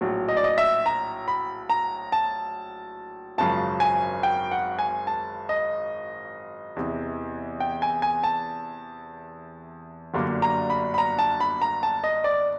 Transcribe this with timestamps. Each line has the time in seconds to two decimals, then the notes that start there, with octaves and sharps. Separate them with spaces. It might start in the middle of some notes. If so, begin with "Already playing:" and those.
0.01 A#1 A2 F#3
0.29 D#5
0.37 D5
0.44 D#5
0.58 E5
0.86 A#5
1.28 B5
1.70 A#5
2.12 A5
3.38 G#1 F#2 C#3 F3 A5
3.80 G#5
4.23 G5
4.51 F#5
4.79 G#5
5.07 A5
5.49 D#5
6.76 E2 C3 E3
7.60 G5
7.82 G#5
8.02 G#5
8.24 A5
10.14 G1 F#2 D3 G3 A#3
10.42 A#5
10.70 B5
10.94 B5
10.98 A#5
11.19 A5
11.40 B5
11.62 A#5
11.83 A5
12.04 D#5
12.24 D5